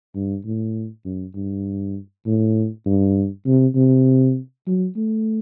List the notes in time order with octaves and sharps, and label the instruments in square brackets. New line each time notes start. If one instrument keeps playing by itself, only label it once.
[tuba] G2
A2
F#2
G2
A2
G2
C3
C3
F#3
A3